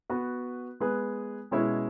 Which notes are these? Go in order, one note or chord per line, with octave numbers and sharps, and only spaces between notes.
B3 F#4 B4
G#3 B3 G#4 B4
B2 G#3 C#4 E4 C#5